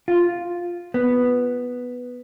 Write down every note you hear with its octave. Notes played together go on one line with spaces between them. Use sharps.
F4
B3